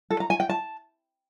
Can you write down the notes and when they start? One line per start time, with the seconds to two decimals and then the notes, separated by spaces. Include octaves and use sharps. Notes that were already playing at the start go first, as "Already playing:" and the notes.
0.11 A4
0.20 A#5
0.30 G#5
0.40 G5
0.50 A5